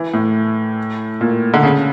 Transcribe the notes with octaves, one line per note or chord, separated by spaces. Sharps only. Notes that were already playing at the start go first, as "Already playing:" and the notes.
Already playing: E3
A2
A#2
D3
C#3